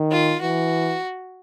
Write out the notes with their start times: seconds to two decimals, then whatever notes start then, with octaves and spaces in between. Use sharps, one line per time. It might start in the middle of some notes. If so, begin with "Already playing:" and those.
Already playing: D#3
0.12 F4
0.41 E3 F#4